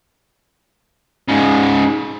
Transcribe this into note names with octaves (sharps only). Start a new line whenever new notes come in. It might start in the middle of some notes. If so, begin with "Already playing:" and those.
G#2 C#3